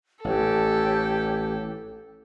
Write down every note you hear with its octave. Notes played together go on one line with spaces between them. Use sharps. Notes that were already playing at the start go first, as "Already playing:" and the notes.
A1 G4 A4 B4 C#5